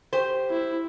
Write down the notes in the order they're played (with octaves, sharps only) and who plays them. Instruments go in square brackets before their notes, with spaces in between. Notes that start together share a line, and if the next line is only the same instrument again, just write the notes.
[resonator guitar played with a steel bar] G4 C5
[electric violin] E4